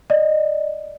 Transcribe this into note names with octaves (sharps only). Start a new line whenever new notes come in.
D5 D#5